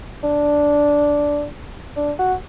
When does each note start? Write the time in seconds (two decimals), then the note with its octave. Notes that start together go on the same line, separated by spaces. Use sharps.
0.23 D4
1.96 D4
2.19 F#4